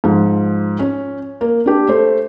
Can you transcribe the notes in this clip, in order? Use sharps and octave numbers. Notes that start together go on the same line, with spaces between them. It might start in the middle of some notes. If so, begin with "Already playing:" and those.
G#2 F3
C#4
A#3
D4 G4
A3 C5